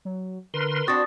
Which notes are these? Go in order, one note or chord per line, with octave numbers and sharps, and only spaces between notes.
F#3
D3 A#4 B4 C6
C4 D4 F#4 C#6 D#6 A6